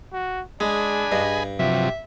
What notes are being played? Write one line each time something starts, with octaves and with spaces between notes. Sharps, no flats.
F#4
G#3 D4 G#4 G#5 B5
G2 D#5
C3 F3 F#3 G4 E5